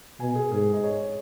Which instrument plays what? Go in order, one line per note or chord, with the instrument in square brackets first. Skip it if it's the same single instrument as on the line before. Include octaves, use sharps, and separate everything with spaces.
[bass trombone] B2 [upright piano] G#5
[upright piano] G#4
[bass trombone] G#2 [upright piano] G#4
[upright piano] D#5
C#5